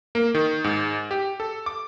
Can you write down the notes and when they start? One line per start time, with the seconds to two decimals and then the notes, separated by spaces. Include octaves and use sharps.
0.15 A#3
0.35 D#3
0.64 G#2
1.11 G4
1.40 A4
1.66 D6